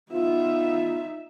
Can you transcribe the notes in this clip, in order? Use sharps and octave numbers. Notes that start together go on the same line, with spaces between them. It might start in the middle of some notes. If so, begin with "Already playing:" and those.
B3 D#4 F4 E5